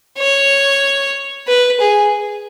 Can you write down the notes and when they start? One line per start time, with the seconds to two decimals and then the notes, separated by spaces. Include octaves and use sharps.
0.18 C#5
1.47 B4
1.80 G#4